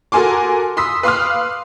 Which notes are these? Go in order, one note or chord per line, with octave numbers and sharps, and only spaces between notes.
F#4 A4 A#4 G#5 C6 D6
B5 C6 D#6 E6 B6
B4 F5 C6 D6 D#6 F6